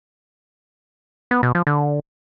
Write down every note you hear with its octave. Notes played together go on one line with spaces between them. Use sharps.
B3
B2
F3
D3